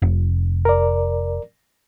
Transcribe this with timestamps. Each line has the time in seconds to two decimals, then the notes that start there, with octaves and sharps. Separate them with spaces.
0.02 F1
0.65 A#4 D5